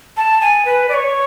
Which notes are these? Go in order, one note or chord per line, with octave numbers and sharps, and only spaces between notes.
A5
G#5
B4
D5
C#5